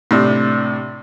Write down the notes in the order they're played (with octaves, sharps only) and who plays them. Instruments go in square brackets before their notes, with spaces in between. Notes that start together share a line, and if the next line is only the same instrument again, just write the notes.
[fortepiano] A2 C3 D4